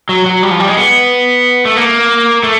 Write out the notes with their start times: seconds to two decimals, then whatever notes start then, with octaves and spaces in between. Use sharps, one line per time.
0.09 F#3
0.26 F#3
0.43 G3
0.51 F3
0.60 G3
0.68 G#3
0.77 B3
1.65 A3
1.76 A#3
2.43 A3